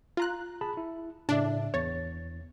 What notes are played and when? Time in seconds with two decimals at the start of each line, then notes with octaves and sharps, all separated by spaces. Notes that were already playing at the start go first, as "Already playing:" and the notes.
0.17 F4 A#5 F#6
0.61 G#4 A5 B5
0.77 E4
1.29 A2 C#3 D4 E5
1.74 E2 C#5 A6